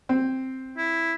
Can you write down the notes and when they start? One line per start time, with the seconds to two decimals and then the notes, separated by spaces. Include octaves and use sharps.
0.09 C4
0.77 E4